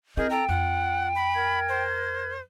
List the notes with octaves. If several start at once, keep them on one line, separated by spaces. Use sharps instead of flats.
C4 E4 G#4 A#4 D#5 G6
A4 G5 A#5
F2 F4 F#5
B5
A#4 G#6
C5